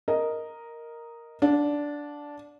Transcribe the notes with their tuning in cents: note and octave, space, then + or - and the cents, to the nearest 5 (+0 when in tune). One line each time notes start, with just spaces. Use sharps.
A#4 +0 D#5 +0
D4 -10 F#5 -45